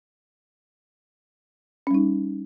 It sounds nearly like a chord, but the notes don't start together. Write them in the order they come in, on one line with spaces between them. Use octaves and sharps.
C#4 G3 D#4